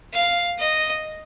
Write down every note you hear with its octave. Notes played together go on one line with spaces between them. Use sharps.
F5
D#5